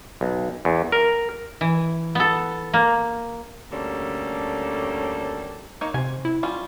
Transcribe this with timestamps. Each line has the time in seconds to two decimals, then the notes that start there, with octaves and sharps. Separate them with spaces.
0.21 B1
0.65 E2
0.92 A#4
1.61 E3
2.15 B3 A4
2.73 A#3
3.71 D2 G3 A#3 C#4 A4
5.81 A#3 D#4 C#5
5.94 C3 C4 G#5
6.25 E4
6.43 G3 C#4 F4